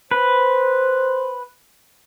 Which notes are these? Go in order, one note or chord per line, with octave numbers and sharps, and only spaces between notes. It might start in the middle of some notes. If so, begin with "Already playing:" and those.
B4 C5